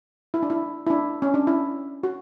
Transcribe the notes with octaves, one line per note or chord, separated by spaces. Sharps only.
E4
D4
E4
E4
D4
C#4
D4
E4
F#4